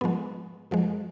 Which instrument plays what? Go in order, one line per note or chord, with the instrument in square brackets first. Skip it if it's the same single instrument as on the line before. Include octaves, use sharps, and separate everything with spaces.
[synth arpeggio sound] G#2 F3 G#3 B3
F#2 F3 G#3